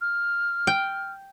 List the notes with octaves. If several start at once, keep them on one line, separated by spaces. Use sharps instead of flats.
F6
G5